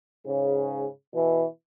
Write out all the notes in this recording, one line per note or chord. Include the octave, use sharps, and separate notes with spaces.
G#2 C#3
B2 E3